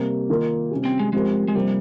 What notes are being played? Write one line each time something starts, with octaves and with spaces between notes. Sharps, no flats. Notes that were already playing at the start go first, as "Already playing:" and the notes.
Already playing: C3 G3 A#3
D#3 A#3 F4 A#4
C3 G3 C#4 G4
C4
G#3
F3 G#3 C4 G4 A#4
G#3
C3 F3 G3 A#3